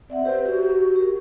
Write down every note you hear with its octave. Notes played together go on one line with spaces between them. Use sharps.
C4 D5 E5 F#5
G4 B4 C5
F#4 G4
G4 A#4